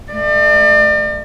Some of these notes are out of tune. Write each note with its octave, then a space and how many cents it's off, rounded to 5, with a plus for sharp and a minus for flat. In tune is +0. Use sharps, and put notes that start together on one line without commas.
A3 +0 D5 +40